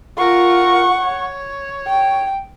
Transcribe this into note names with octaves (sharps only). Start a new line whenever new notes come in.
F4 A#4 F#5 C#6
C#5
G5